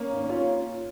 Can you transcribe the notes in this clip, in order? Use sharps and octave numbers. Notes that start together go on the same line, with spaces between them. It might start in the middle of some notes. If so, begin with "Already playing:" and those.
Already playing: A#3 C#4
G#1
C#4 F4